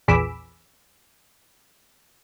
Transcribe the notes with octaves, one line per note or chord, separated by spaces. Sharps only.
A#1 E2 G#4 B5 D6 E6